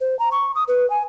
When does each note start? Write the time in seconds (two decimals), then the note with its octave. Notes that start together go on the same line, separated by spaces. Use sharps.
0.01 C5
0.19 A#5
0.32 C#6
0.55 D#6
0.68 B4
0.90 G#5